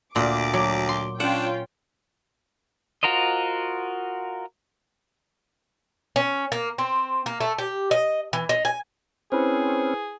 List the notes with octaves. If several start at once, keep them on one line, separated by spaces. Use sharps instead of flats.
D2 A#2 D6
F#3
C6
C#4 D4 F4 F#5 G5
F4 F#4 A#4 C5 D#5
C#4
A#3
C4
A#3
A3
G4
D#5
E3
D#4
G#5
C4 C#4 E4 G#4 B4 C5